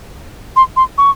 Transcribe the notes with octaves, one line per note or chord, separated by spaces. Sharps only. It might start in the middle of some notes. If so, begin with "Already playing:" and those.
C6
C6
C#6